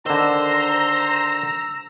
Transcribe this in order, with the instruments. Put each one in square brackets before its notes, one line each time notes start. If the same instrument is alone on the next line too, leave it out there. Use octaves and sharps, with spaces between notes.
[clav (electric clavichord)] D3 D#3 [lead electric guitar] C5 [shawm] A#5 [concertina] E6